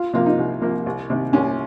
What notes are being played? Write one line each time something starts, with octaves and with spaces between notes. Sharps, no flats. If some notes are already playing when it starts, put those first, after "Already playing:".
Already playing: F4
C3 F3 A#3 F4
D#4
C2
C3 F3 A#3
C2
C3 D#3
C2 C#4